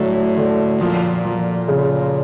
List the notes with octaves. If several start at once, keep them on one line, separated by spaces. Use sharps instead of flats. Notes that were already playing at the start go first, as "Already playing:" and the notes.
Already playing: A2 D3 F#3
D3
A#2 F3
F3
C#3